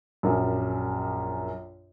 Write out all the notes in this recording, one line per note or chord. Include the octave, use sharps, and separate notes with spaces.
A#1 F#2